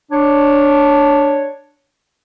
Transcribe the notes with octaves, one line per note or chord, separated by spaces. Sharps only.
D4 C#5